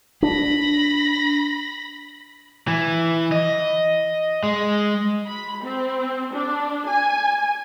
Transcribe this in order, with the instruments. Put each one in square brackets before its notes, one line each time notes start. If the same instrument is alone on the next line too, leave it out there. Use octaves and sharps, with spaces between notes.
[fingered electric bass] D4 [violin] B5 A#6
[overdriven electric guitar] E3
D#5
G#3
[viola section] B5
C4
D4
G#5